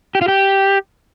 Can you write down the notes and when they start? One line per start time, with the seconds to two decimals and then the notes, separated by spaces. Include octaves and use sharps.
0.15 G4
0.22 F4
0.28 G4